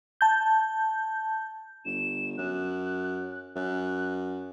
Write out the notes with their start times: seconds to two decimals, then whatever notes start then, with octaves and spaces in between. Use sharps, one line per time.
0.21 A5 G6
1.85 G1 E7
2.38 F#2 F#6
3.56 F#2 F#6